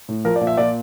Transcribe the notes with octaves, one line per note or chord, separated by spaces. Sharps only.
A2
F3 A#4
D5
A#2
E5
A#2 D5